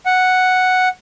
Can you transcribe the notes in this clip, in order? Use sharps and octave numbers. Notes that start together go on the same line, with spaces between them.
F#5